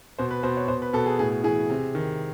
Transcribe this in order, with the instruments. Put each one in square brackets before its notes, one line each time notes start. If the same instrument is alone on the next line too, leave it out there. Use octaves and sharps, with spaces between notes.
[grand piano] B2 C5
B4
B2 C5
C#5
B2 C5
B4
B2 A4
G#4
A2 G#4
E3 G#4
C3
D#3